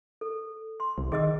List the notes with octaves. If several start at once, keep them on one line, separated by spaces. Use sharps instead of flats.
A4
C6
C2
D#3 G#4 D#5 E6